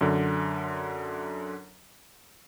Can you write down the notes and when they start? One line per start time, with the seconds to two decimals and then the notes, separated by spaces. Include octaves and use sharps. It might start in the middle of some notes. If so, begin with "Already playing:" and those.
0.01 F#2 D3